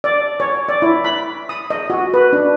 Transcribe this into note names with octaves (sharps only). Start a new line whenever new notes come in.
D5
C#5
D5
E4
B5
D#6
D#5
F#4
B4
D4